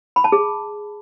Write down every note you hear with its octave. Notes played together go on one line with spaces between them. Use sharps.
B5
A5
G#4